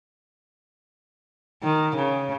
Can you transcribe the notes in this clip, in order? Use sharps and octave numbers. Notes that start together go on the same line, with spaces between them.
D#3
C#3